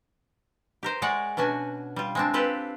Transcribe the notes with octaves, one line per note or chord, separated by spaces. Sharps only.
G4 A#4 C5
G#3 C#5 D5 F#5
B2 C#4 D4 F#4 G#5
G3 F4
G#3 C4 D4
C4 F4 G4 A4 B4